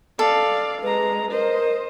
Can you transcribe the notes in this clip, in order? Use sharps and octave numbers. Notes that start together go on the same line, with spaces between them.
A4 D5 F5
G#3 B4 A#5
A#4 C5 D#5